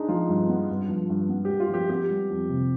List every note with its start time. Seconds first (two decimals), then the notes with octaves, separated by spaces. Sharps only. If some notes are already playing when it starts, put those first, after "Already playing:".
Already playing: G#3 D4 D#4
0.08 F3 F4
0.29 G2
0.49 B3
0.69 G2
0.89 F3
1.09 G2
1.29 B3
1.45 G4
1.49 G2
1.60 F4
1.69 F3 G4
1.89 B3 G4
2.10 G3
2.30 F2
2.50 C3